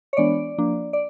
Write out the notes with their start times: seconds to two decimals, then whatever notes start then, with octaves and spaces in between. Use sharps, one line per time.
0.13 C#5
0.17 E3 G#3 B3 D4 D5
0.58 F3 A#3 D4
0.93 D5